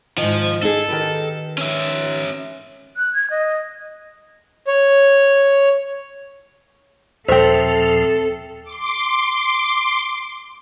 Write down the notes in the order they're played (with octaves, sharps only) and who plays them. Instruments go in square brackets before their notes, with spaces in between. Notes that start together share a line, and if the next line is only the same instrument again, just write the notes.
[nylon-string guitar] G#2 D#3 [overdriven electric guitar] F3
[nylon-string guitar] D#4 G#4 [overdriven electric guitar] A4
[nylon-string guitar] D#3 G4 B4
[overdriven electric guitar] C#4 E5
[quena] F#6
G#6
D#5
[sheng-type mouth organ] C#5
[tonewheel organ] D#2 A#2 F3 [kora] C4 E5 [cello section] A4 [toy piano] C5
[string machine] C6 D6